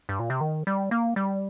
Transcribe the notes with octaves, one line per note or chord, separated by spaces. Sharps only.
G2
A#2
C3
D#3
G3
A#3
G3